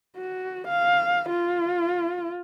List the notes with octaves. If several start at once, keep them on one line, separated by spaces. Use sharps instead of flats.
F#4
F5
F4